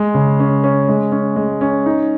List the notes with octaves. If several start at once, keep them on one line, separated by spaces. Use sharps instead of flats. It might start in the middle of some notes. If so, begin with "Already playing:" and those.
Already playing: G#3
C#3
C#4
C#4
G#3
C#4
G#3
C#4
D#4